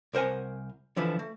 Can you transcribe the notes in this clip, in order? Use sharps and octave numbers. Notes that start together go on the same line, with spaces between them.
C2 A#4 C5 F#5 G#5
D3 E3 F3 B4
A3